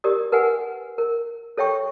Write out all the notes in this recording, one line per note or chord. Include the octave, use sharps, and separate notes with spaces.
G4 A#4 D5 D#6
A#4 B4 F#5 G#5
A#4
A4 C#5 E5 G5 C#6